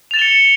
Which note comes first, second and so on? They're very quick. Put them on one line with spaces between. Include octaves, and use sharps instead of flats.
F7 A6 E7 G7 C#7